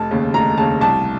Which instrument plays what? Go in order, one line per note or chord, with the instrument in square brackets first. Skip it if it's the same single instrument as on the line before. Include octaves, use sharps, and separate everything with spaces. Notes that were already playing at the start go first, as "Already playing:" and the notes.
Already playing: [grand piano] F1 A5
D#2 C#3
F1 A#5
D#2 C#3 A5
C2 A5